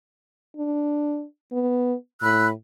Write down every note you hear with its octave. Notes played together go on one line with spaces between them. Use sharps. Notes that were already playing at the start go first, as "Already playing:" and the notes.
D4
B3
A2 B5 E6 F#6